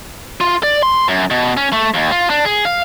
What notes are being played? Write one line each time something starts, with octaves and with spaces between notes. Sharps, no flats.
F4
D5
C6
F#2
B2
C#4
A3
D#2
F4
D4
G#4
F5